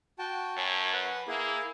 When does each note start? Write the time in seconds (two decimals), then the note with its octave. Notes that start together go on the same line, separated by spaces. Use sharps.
0.19 F#4 G5 A5
0.57 F#2 C#5 A5 C#6
0.94 B4 F#5
1.28 A#3 E4 G#4